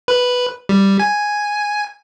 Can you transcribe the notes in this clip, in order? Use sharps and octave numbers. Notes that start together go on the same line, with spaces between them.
B4
G3
G#5